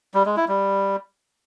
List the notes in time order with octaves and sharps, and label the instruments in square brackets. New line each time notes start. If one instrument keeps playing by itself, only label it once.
[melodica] G3
G#3
E4
G3